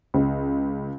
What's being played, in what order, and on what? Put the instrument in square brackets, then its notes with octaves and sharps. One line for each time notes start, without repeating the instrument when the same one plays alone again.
[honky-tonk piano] C#2